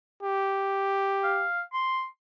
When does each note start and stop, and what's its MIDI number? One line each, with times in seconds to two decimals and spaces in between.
0.23 1.46 67
1.24 1.61 77
1.73 2.06 84